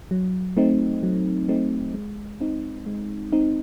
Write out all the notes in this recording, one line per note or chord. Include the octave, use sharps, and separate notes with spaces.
F#3
A3 C4 D#4
F#3
A3 C4 D#4
G#3
C4 D#4
G#3
C4 D#4